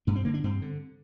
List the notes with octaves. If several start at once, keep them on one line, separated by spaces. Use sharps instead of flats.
G2 D4
C4
D3 A#3
D4
G2 C4
D3